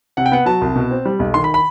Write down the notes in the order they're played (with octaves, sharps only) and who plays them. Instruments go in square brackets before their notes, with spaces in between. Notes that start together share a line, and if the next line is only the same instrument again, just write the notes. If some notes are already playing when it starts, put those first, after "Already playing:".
[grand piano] C3 F#5
G5
B3 F#5
F#3 A5
C2
B2
C4
G3
B1
D#3 C6
B5
B5